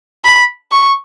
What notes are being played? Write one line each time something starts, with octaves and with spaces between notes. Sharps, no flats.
B5
C#6